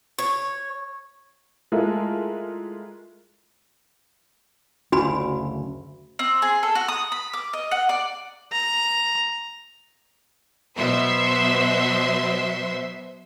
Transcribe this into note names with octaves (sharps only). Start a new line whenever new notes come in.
C#5
G#3 A3 E4 F4 A4 A#4
F#1 D2 C#4 F#4 G#5 B5
C4
G#4
A4
F#4
D#6
B5
D6
D#5
F#5
D5
A#5
B2 F#3 C5 E5 C6 B6